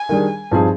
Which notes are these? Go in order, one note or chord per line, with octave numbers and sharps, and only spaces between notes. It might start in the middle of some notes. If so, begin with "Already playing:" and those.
Already playing: G#5
D#3 G3 D4 G#4
G2 F3 C4 D#4 G#4